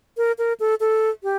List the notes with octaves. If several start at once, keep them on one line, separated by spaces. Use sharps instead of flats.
A#4
A#4
A4
A4
G4